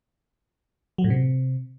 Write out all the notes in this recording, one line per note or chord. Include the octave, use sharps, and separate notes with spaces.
F#3
A2
C3